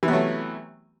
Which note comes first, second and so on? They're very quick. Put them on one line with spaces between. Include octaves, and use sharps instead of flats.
E3 C3 B3 F#3 A3